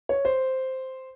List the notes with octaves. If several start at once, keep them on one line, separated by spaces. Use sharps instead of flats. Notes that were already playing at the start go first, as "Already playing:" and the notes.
C#5
C5